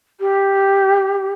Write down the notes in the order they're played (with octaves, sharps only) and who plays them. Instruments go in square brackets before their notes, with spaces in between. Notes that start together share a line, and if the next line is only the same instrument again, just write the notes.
[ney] G4